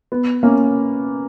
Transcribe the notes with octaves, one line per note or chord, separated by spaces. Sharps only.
B3
A#3 C#4